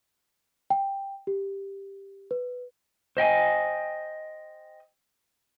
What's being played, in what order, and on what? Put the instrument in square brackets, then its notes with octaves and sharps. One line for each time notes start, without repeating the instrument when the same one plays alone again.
[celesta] G5
G4
B4
[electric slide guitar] C5 D#5 G5 G#5